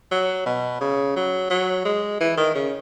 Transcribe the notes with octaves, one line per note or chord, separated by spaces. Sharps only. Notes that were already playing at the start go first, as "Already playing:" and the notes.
F#3
B2
C#3
F#3
F#3
G#3
E3
D#3
C#3